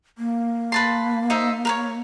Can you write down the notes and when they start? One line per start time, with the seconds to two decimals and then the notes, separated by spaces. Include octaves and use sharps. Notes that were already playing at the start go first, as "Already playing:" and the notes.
0.18 A#3
0.72 B4 A5 C6
1.30 D#4 C5 E5
1.65 A#4 B4 C#5